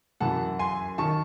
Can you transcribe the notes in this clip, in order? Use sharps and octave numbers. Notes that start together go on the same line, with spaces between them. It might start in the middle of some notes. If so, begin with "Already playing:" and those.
F#2 E3 F#5 A5
G#5 C6
D#3 A5 C#6